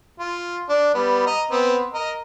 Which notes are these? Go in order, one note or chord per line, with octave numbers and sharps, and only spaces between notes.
F4
D4
G3 B3
D#5 A#5
B3 C4
A#4 D#5